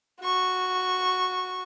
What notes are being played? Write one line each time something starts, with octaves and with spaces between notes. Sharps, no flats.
F#4 C#6